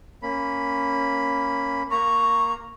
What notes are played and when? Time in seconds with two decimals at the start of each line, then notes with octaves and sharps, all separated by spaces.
0.23 A#3 C#4 B5
1.91 A#3 A#5 C#6